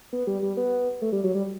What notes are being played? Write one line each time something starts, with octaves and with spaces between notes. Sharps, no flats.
B3
G3
G3
B3
A3
G3
F#3
G3